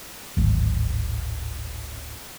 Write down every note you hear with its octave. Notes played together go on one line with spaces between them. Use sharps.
D1 G#1